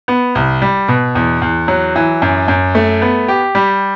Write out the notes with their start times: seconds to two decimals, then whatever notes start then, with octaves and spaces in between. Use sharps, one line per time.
0.08 B3
0.35 C2
0.62 G3
0.88 B2
1.15 E2
1.42 E2
1.68 F#3
1.96 E3
2.22 F#2
2.48 F#2
2.75 A3
3.02 B3
3.28 G4
3.55 G3